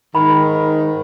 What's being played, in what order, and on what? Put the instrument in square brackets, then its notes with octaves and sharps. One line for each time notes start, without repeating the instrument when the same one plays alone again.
[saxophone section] G#2 D#3 [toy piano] B5